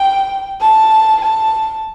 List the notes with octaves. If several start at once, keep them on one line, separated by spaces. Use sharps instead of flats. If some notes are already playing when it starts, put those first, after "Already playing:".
Already playing: G5
A5
A5